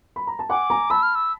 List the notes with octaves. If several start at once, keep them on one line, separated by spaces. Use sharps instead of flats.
B5
A#5
A5
F#5 G#5 D6
G#5 A#5
A5 B5 E6
F6
E6